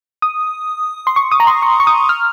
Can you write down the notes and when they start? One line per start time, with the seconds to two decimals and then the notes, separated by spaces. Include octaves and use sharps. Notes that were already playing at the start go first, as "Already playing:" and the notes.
0.22 D#6
1.07 C6
1.16 C#6
1.32 D#6
1.40 A#5
1.47 C6
1.62 C#6
1.80 C#6
1.87 D#6
2.09 F6